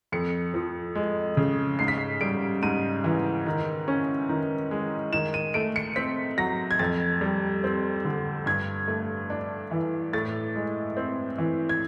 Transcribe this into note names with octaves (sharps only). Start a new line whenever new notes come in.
F2 C#7
F3
G#3
C#3
G#2 C7
B6
C7
G3 D7
G#2 D#7
E3
D#3
C#4
D#3
G#3
D#3 E7
D#7
A3 D7
C#7
C4 B6
F#3 A#6
G#6
F2 A6
G3
C4
D3
G2 G#6
A3
D4
E3
A2 A6
G#3
C4
E3
G#6